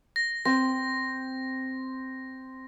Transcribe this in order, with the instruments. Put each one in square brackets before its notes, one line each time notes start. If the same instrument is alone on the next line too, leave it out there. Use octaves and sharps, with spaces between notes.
[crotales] A#6
[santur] C4 [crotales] A#6